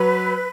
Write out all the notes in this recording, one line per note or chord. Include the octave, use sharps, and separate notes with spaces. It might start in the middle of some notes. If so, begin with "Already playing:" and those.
Already playing: F#3 B4